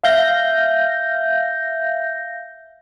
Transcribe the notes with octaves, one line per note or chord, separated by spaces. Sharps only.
E5 F5 G6 A#6